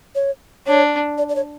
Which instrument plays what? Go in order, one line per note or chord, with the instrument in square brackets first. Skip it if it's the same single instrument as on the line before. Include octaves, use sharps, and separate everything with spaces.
[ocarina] C#5
[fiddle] D4 [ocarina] C#5
[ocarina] D5
D5
C#5